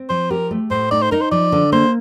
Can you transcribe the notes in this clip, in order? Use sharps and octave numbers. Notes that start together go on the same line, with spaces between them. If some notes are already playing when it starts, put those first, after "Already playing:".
Already playing: C4
F3 C5
G4 A#4
A3
A2 C5
D#4 D5
C5
D#4 A#4
C5
F3 D5
D3
A#3 C5